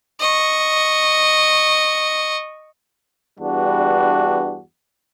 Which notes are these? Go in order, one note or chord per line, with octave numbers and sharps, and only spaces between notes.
D#5 C#6
E2 G2 G3 D4 F#4